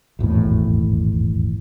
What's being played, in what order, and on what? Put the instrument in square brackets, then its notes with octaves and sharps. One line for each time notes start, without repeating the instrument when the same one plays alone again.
[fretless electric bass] D#1 G#1 E2 A2